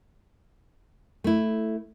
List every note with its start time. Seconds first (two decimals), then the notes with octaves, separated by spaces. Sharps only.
1.24 A3 E4